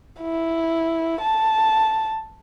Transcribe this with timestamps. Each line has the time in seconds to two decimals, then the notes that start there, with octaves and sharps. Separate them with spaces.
0.21 E4
1.22 A5